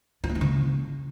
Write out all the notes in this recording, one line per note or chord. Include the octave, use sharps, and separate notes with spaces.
F4
A#3
E4
C#3